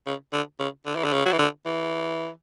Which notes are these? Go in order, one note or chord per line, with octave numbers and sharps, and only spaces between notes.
C#3
D3
C#3
D3
E3
D3
C#3
F#3
E3
D3
E3